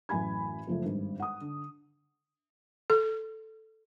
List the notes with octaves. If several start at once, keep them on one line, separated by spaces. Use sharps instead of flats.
A1 F#2 G#5 B5 G#6
F#1 F3 A3
G#1 G2
F#5 D#6
D3
A4